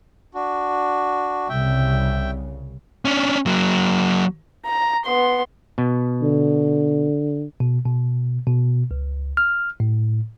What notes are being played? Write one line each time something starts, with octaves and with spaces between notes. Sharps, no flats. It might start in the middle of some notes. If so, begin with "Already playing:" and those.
D4 F#4
C2 C#3 E5 G5
C#4 D4
F#3 A#3
A#5
B3 C6
B2
D3
B2
B2
B2
C#2
F6
A2